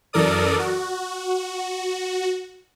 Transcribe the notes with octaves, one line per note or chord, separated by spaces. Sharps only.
F#2 E3 A4 A#4 D5 D#6
F#4